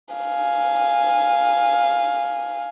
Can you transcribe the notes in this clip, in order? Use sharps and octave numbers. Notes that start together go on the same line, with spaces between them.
F5 G#5